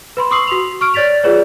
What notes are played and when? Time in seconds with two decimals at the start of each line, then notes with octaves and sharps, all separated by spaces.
0.17 B4 B5 C6
0.31 C6 C#6 D#6 E6 C7 F#7
0.48 F#4 F7
0.81 C#6 F6 D7
0.94 C#5 D5 A6 B6 F7
1.23 F4 G#4 B4 C#5 D5